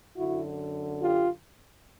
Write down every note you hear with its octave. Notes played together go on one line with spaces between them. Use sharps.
F#2 D3 E4 F#4
F4 G4